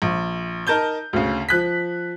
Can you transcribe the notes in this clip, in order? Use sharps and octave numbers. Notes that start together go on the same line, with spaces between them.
A#1
D#4 A#4 A5 G6 G7
D2 C#3
F3 F#6 B6